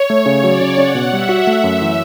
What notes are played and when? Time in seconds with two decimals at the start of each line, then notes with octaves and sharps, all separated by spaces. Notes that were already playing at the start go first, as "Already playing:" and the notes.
Already playing: C#5
0.10 A3
0.26 C#3
0.43 F#3 D5
0.61 C#3
0.78 C#4 F#5
0.95 B2
1.12 G3 E5
1.29 F#4
1.47 A3 E5
1.64 F#2
1.81 E3